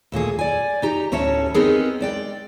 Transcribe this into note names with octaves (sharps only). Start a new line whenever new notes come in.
D#2 A#2 A3 G#4
D5 G#5
D#4 G4 A#5
D2 A2 C#4 C#5 E5 A5
B3 C4 D#4 G4 G#4 A#4
G#3 D5 G5